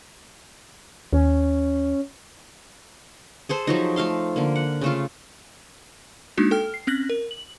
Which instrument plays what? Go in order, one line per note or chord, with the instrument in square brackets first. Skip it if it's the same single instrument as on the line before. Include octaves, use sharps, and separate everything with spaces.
[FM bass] D#2 [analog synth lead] C#4
[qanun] G#4 A4 C5
F3 F#3 D#4
A3 F4 F5 C6
D3 A#3
F#5
C#3 A3 F4
[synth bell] G#3 A#3 D4 D#4 F#4
A4 G5 F6
C7
C4 C#4 F#6 A#6 F#7
A#4
F#7